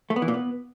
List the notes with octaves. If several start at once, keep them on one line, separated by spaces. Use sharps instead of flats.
A3
B3
E3
A#2
B3